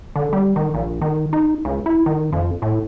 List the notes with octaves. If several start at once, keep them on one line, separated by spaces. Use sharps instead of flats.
D3
G3
D#3
A#1
D#3
D#4
C#2
E4
D#3
F2
A2